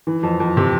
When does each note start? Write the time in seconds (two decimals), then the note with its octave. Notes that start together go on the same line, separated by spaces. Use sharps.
0.07 E3
0.23 F2
0.40 F2
0.57 C3